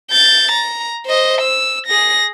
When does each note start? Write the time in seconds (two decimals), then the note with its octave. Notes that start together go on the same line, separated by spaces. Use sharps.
0.11 G6 A6
0.52 A#5
1.06 C5 D#5
1.42 E6
1.87 G#4 A#6